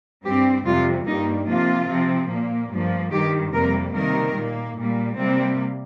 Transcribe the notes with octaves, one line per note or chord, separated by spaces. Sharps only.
G2 G3 C4 G4
F2 C3 G3 F4
G2 G3 A#3 D#4
C3 F3 A#3 F4
C3 F3 C4
A#2 A#3
G2 F3 A#3
G2 D#3 G3 G4
F2 C3 G3 A#3 A#4
C3 D#3 G3 A#3 A#4
A#2 A#3
A#2 G3 A#3
C3 G3 A#3 C4